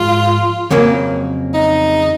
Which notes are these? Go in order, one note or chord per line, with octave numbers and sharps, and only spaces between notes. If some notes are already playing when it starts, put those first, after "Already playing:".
Already playing: G#2 F3 G#3 F4
F2 C#3 F#3 A#3
D#4